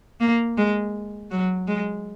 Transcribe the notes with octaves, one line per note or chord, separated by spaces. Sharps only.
A#3
G#3
F#3
G#3